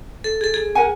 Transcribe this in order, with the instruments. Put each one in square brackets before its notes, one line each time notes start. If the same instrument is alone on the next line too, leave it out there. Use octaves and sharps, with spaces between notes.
[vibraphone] A4
G#4 A4
G#4
[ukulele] A#4 F#5 G#5